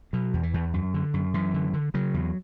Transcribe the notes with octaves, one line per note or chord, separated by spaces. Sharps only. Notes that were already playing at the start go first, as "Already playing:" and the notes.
B2 F#3
E2
E3
E2
F#2
D3
F#2
F#2 E3
D3
D3
C#3 F#3
E2